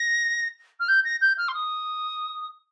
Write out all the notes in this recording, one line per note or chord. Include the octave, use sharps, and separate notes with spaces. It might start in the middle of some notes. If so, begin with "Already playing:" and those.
Already playing: A#6
F6
G6
A#6
G6
F6
C6
D#6